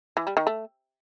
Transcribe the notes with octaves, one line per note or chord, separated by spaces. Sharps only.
E3
G3
D#3
A3